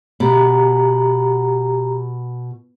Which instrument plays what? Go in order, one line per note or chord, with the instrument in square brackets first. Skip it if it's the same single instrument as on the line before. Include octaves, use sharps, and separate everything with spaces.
[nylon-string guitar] B2 [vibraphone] G4 A#5